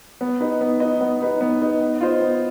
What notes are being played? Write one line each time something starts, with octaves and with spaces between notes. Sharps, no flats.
B3
D#4 B4 D#5
B3
D#4 B4 D#5
B3
D#4 B4 D#5
B3
D#4 B4 D#5
B3
F4 C5 D#5
B3